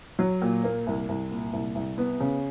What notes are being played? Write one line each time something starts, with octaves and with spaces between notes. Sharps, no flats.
F#3
A#2
A#3
C2
C2
A#2
C2
C2
B3
C#3